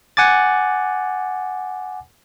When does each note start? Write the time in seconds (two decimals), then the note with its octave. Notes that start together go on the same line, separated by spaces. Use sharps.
0.17 F#5 G#5 D6 A6